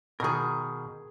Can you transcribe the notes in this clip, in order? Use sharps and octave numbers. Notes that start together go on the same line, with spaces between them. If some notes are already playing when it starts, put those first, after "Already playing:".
B2 D#3 G#4 A#4